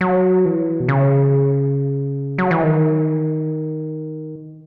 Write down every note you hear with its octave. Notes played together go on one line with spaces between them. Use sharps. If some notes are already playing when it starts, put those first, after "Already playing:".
F#3
E3
B2
C#3
F#3
E3
D#3